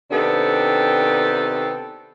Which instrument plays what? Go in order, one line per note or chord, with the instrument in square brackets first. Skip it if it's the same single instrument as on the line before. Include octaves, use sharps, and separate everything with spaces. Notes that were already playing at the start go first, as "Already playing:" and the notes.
[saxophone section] C3 D#3 B3 C4 D4 A4